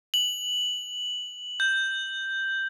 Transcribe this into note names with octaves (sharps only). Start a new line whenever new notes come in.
F#7
G6